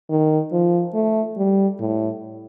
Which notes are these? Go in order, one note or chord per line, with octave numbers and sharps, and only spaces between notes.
D#3
F3
A3
G3
A2